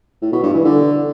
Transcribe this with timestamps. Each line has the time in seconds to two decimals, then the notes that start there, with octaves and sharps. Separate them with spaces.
0.22 A2
0.32 B2
0.43 G2
0.54 E3
0.64 D3